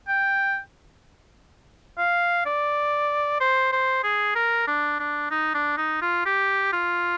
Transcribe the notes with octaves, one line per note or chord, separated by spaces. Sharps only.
G5
F5
D5
C5
C5
G#4
A#4
D4
D4
D#4
D4
D#4
F4
G4
F4